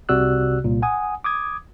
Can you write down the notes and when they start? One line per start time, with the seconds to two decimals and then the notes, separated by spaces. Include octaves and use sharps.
0.09 C2 C3 F#4 D5 E6 F#6
0.64 C2 A#2
0.82 F#5 G#5 D#6
1.24 D6 D#6 G#6